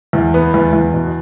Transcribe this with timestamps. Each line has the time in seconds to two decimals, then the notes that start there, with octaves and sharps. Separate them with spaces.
0.13 E2
0.34 B3
0.54 E2
0.73 E2
0.94 B2